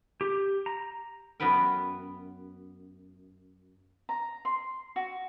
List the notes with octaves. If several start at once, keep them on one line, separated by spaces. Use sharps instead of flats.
G4
A#5
F#2 B3 F#4 B4 G5
A#5
C6
F#4